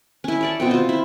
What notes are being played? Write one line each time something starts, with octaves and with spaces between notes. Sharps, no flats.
C#4 E4
C#5 D5 A5
B2 C4 G5
F4 C5
E4